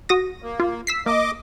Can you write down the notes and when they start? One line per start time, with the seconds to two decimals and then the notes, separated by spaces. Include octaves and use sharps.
0.09 F#4 D#6 A#6
0.42 A#3
0.60 F4
0.87 E6 B6 C7
1.06 A#3 D#5 D6